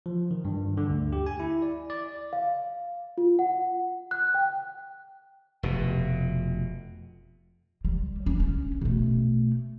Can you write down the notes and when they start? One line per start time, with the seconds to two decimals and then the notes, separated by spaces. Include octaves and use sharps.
0.06 F3
0.31 D#3
0.45 G2
0.77 D3
0.90 D2
1.13 G4
1.26 G#5
1.40 E4
1.62 D5
1.90 D5
2.33 F5
3.18 F4
3.39 F#5
4.11 F#6
4.34 G5
5.63 F1 B2
7.85 G3
8.26 C#4
8.40 C#4
8.81 B2 A3